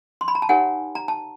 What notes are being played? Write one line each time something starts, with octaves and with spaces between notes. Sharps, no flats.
C6
B5
A#5
A5
D#4 G4 A#4 C#5 F#5 G#5
A#5
A5